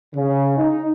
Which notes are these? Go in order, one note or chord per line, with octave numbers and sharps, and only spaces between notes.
C#3
D#4